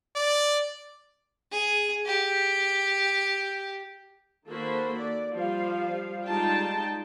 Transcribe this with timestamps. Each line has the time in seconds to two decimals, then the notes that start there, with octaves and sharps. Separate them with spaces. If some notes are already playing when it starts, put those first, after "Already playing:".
0.15 D5
1.52 G#4
2.06 G4
4.48 D#3 A#3 F#4 A4 C5 B5
4.98 D5
5.34 F3 G3 F5
6.27 G3 G#3 D#4 F4 G5 A5